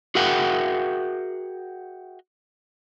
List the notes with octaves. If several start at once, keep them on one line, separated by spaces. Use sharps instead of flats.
F#4 G#4 A#4 E5 F#5 G5